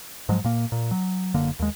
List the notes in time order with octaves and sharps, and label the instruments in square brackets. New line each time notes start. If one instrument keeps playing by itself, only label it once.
[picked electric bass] G#2 F3 F#3 G#3
A#2 A#3
A#2
F#3
F#1 D3 A#3
D#2 G#3